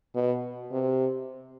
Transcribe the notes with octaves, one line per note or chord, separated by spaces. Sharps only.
B2
C3